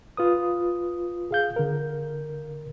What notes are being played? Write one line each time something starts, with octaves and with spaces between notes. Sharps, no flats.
F4 B4 D#6
G#4 F5 G6
D3 A#4